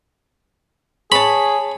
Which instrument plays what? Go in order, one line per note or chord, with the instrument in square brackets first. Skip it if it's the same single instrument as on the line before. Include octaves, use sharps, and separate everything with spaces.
[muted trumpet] G#4 [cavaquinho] C#5 A5 [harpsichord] B5